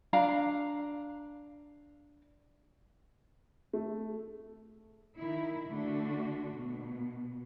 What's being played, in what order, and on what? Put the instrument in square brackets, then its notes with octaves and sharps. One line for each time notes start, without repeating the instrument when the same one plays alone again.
[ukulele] D4 F5 A#5
[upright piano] A3
[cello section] D#3 E4
D3 A3 D4 F#4
B2